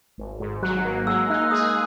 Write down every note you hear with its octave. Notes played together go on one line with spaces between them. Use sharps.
G#1
G#2
F#3 F#6
A#3
G#3 E6
D#4 F#6
E6
G#4 D#6